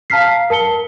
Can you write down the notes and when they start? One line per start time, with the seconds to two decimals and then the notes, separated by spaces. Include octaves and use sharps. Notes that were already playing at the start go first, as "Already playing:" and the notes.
0.10 F5 A5 A#5 F6 B6 C7
0.50 A#4 A5 C#7 G7